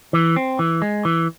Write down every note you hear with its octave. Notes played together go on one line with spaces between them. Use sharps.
E3
C4
E3
G#3
E3